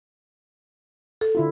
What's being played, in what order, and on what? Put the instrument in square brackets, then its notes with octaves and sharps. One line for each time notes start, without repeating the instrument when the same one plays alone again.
[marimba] A4
[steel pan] D3 E4 F4